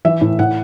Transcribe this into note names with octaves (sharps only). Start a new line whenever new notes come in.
E3 E5
A2
A2 F#5